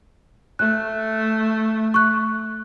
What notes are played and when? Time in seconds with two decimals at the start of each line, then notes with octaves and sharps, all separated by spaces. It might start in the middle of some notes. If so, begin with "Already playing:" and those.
0.59 A3 F#6
1.94 C#6 F#6